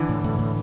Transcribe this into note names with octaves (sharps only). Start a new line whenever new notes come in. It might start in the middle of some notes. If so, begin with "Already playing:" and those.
Already playing: D3 E3
A2
A2
A2